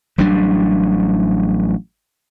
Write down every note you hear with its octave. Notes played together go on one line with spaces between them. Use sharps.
A1 F#3 G3 D4